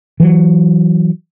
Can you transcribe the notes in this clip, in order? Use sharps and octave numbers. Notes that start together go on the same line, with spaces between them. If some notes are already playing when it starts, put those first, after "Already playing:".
E3 F#3